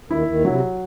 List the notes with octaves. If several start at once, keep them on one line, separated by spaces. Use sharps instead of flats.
D#2 D#3 E4
D#2 D#3
C3 F#3